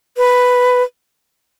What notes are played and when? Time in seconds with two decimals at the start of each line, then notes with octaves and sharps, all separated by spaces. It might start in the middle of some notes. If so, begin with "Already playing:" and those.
0.17 B4